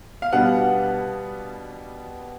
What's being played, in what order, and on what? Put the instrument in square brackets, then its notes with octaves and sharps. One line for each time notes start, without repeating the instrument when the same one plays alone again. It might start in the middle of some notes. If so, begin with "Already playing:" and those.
[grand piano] F5
B2 G3 B3 D4 F#5